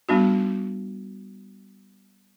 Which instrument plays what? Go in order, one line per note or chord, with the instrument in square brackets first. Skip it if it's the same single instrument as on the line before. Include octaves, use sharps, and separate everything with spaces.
[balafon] G3 B3 D4 F#4